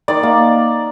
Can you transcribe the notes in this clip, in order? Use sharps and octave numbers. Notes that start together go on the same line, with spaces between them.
D#3 D5
A#3